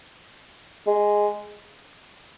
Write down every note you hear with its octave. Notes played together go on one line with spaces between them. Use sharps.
G#3